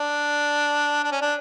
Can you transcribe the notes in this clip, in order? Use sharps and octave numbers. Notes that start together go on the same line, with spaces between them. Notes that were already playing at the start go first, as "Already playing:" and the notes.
Already playing: D4
D4
C#4
D4